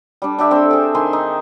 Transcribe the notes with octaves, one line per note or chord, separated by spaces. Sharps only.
G3 D4
D4 G4 E5
C4 A4
C4 G#4
D#3 G#5 C6
D#4